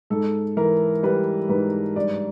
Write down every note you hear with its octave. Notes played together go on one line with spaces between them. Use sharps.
G#2 A4
E3 A#4
G3 B4
G#2 B4
G2 D5